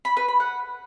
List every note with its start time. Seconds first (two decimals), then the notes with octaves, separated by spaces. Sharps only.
0.05 B5
0.17 B4
0.28 B5
0.40 F#5